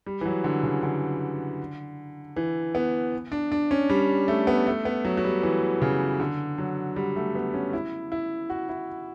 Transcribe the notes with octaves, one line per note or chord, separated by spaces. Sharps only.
G3
E3
F#3
D3
C#3
D3
E3
B3
D4
D4
C#4
G3
A3
B3
A3
B3
F#3
F#3
G3
E3
C#3
D3
F#3
G3
A3
B3
C#4
E4
E4
F#4
E4